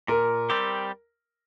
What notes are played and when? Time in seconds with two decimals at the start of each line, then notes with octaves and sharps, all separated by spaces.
0.08 A#2 A#4
0.50 G3 C4 G4